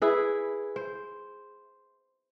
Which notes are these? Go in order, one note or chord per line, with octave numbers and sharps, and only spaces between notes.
E4 G#4 B4
C5